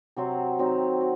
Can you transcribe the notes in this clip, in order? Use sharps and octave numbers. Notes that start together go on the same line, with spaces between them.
C3 F#3 C4
D#3 F#3 C4 D#4
F#4